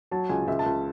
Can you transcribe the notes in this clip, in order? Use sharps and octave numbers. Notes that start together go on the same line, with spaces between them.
F#3 A5
C#2 G#5
C#2 E5
A5
C#2